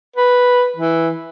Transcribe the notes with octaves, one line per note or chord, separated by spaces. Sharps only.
B4
E3